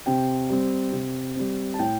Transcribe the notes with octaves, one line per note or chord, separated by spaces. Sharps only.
C3 G5
G3 C4
C3
G3 C4
A5
A2 G5